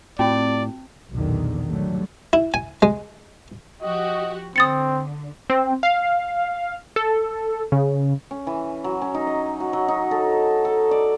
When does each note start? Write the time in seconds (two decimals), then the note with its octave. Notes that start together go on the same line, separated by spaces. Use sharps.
0.19 A2 C4 F4 D5 G5
1.12 B1 E2 A#2 D3 D#3
1.70 D3 F#3 G3 A3
2.33 E4
2.54 G#5
2.82 G#3
3.82 F3 F#4 G4 D#5
4.56 D3 C4 D#6 A6 C#7
5.50 C4
5.83 F5
6.96 A4
7.72 C#3
8.31 C#4
8.47 E3
8.84 F#3
9.01 C#4
9.14 D#4
9.27 D#5
9.60 F#4
9.73 F#3
9.88 D#4
10.11 A4
10.65 A4
10.91 D5